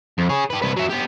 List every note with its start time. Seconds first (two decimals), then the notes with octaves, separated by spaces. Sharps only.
0.18 F2
0.29 G#4 C#5
0.50 G4 B4
0.62 C2 B4
0.77 F#3 E5
0.90 B3 G4